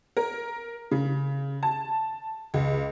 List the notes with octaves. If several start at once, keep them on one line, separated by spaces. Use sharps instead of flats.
A#4
C#3
A5
C#2